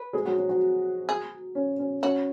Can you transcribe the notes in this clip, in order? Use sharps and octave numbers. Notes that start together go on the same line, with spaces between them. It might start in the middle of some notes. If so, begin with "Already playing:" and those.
Already playing: B4
G#3 G#4
F#3 F#4
F#3 F#4
F#3 F#4
G#4
C#4
C#4
C#4 F#4